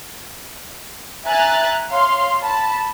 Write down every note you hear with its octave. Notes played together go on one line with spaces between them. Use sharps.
E5 G#5 A#5 F#6 A6
C#5 F5 C6
A5 B5